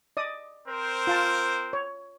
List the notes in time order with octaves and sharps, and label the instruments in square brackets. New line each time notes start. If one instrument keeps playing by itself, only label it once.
[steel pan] D5 D#5 D#6
[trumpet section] C4 A#4 C5
[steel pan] F4 F5 A5
C#5